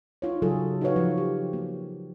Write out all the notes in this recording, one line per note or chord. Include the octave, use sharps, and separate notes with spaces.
D#4 F4 C#5
C#3 F#3 F4 G#4 A4
D#4 F#4 A4 B4 C#5 F5
F3
G4
A#3